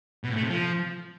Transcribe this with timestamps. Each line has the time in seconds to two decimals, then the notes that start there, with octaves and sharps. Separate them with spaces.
0.24 B2
0.30 A2
0.36 A3
0.43 C3
0.49 F3